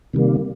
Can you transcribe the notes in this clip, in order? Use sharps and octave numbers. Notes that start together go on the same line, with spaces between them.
C3 D#3 G3 A#3